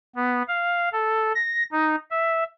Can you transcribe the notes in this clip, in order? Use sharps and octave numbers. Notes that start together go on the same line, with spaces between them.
B3
F5
A4
A#6
D#4
E5